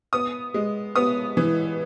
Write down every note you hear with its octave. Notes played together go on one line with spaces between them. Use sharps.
B3 D#6
G#3
B3 D#6
E3